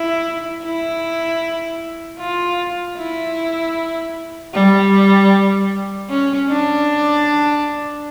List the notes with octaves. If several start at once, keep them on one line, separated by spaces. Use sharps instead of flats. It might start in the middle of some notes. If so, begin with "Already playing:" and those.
Already playing: E4
E4
F4
E4
G3
C#4
D4